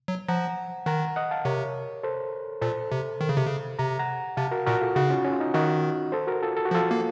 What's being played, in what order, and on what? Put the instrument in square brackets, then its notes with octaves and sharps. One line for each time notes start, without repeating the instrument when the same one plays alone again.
[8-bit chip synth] F#3
[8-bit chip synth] F3 [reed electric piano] F#5 A#5
[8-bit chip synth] D#3 [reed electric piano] F#5 A#5
[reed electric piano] D#5 F#5
F5 A5
[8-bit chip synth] C3 [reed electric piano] A#4 C#5
[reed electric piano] A4 C5
[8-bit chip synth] A#2 [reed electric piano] A4 C5
[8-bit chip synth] C3
D#3
C#3
C3
C#3
[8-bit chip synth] C3 [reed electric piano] A#5
[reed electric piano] F#5 A#5
[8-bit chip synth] C3 [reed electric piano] F5 A5
[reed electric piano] F#4 A#4
[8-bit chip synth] A#2 [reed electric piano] F#4 A#4
[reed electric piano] F4 A4
[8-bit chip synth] C#3 [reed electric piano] D#4 F#4
[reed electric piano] C#4 F4
C#4
F4
D#4
[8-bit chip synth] D#3 [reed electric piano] D#4 F#4
[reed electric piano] A4 C5
F#4 A#4
F4 A4
A4
F#4
[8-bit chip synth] F3 [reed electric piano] F4 A4
[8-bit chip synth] A#3